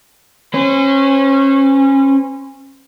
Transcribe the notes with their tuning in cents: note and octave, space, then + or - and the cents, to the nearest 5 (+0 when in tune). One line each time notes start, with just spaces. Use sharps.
C#4 -25 C5 -40